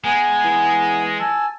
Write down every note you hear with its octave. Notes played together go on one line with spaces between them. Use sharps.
G#3 B3 G#5
E3
G#5 A5 E6